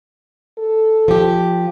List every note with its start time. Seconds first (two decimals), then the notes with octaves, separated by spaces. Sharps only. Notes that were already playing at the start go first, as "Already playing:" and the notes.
0.58 A4
1.08 F3 G4